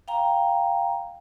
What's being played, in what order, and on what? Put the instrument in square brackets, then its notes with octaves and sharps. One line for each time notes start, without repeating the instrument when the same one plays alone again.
[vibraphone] F5 G5 A#5